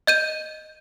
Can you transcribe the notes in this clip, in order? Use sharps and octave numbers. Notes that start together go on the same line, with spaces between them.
D#5 G6 D#7